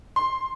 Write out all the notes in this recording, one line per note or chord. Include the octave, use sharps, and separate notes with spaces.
C6